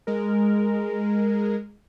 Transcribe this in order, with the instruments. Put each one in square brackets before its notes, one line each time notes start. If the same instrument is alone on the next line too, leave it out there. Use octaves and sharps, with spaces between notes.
[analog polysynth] G#3 A#4